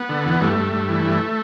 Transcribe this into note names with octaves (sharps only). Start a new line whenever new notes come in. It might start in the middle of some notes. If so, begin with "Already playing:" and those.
Already playing: B3
D3
E2
G2 A3
G2
G2
E3
G2